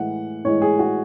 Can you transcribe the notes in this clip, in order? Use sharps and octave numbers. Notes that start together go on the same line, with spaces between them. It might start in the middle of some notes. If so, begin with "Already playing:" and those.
Already playing: A2 E3 G#3 F#5
A2 E3 G#3 C#5
G#4
F#4